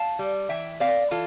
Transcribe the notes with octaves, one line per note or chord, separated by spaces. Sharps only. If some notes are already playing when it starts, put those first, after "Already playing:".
Already playing: F5 A5
G3
E3 E5 G5
C4 D5 F5
E3 F4 A4